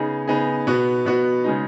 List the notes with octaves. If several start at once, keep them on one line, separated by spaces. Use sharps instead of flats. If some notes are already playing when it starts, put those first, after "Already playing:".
Already playing: C#3 B3 D#4 G#4
C#3 B3 D#4 G#4
B2 B3 F#4
B2 B3 F#4
C#3 G#3 D#4